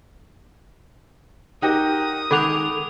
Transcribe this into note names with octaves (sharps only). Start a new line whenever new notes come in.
D#4 F#4 G4 A#4 G5 D#6
D#3 G#3 A4 F#5 B5 D6 F7